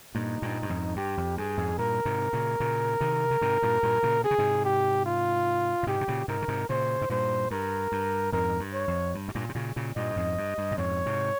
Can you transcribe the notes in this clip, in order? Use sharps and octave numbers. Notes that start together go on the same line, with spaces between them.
G2 A#2 D#4
G2 A#2
G2
F2 G#2
G2 G4
F2
G2 G#4
F2 G#2
G2 A#2 A#4
G#2 C3
A#2 C#3
A#2 C#3
C3 D#3
C#3
G#2 C3
G2 A#2
G2 A#2
A#2 C#3
C3 G#4
C#3
G#2 C3
G4
F4
A#2
G#2 C3 G4
C3
A#2 C#3
G#2 C3 A#4
C#3
G#2 C3
A#2 C#3 C5
G#2
G2 A#2 C5
G2 A#4
G2
F2 G#2 A#4
G2
C#5
F2
G2
G#2
G2 A#2
C3
A#2 C#3
A#2 C#3
G2 A#2 D#5
F2 G#2
G2
G2
A#2
F2 G#2 C#5
G#2 C3